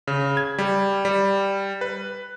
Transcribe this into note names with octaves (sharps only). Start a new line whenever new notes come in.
C#3
G#6
G3
G3
B4